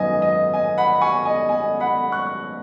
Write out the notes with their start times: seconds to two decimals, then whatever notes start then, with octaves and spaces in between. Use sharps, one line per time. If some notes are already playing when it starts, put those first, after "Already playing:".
Already playing: G#1 F#2 F#3 B3 D#4 D#5 G#5
0.22 D#5
0.53 D#5 G#5
0.78 F#5 B5
1.01 G#5 C#6
1.25 D#5 G#5
1.49 D#5 G#5
1.80 F#5 B5
2.12 C#6 F#6